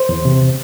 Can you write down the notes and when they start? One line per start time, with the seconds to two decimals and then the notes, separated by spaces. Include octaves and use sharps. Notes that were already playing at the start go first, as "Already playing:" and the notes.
Already playing: C5
0.09 E2
0.25 C3